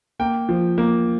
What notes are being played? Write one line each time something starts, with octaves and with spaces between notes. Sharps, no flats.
A#3 G5
F3
A#3